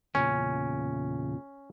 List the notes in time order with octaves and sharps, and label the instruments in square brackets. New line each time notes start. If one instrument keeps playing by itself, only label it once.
[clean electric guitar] E2 A#2 C#3 [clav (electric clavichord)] C#4